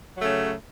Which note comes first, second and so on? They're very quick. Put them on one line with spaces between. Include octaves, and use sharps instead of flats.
F#3 A3 C#3